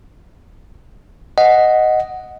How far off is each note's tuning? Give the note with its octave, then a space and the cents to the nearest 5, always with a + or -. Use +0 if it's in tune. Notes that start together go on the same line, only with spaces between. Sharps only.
D#5 +0 F#5 +0